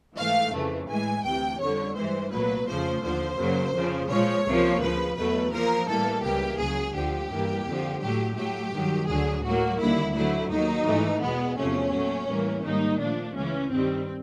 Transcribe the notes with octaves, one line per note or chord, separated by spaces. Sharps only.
G#2 E3 A3 F5
F2 C#3 E3 A3
A2 E3 G#3 G#5
D2 C3 E3 G5
F2 D3 G3 C#5
G2 E3 G#3 C5
C2 A#2 F#3 A3 B4
F2 C#3 F3 A3 C5
D#2 D3 F3 C5
F#2 C#3 F#3 A#3
F2 C#3 F3
A#2 F3 G#3 C#5
C#2 C3 F3 A#3
D2 C#3 F3 B4
E2 B2 F#3 A3 B4
A#2 F3 A#3 A#4
A2 E3 G3 A#3 A4
C#2 C#3 E3 G3 A#3 G4
C#2 C#3 F#3 G#4
D2 D3 F3 G4
G2 E3 G3 A#3
F2 D3 F3
A2 F#3 A3 G4
A2 F#3 A3 G4
G2 D#3 F#3
D2 D3 F#3 G#4
A2 F#3 A#3 F#4
D#2 D3 G3 E4
D2 D3 F#3 A3 E4
D#2 D#3 F#3 D#4
G#2 E3 A3
E2 B2 G#3 B3
E2 C3 F3 A3 C#4
A#2 F#3 A3
A2 E3 G3 A#3
G#2 D#3 G3 A#3 D#4
A#2 F3 A3 D4
C#2 C#3 E3 C#4
G2 D#3 G3 C4